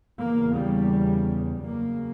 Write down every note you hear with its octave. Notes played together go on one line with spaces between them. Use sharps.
E2 C#3 A#3
G3
F#2 C#3 A#3